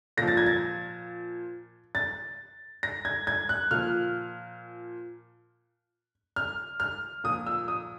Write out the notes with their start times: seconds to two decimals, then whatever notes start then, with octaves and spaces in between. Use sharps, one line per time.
0.17 A#2 F3 A#6
0.28 A6
0.37 G#6
0.46 A6
1.95 A6
2.83 A#6
3.05 G#6
3.27 G#6
3.49 F#6
3.71 A#2 F3 F6
6.36 F6
6.80 F6
7.24 A#2 F3 D#6
7.46 E6
7.68 D#6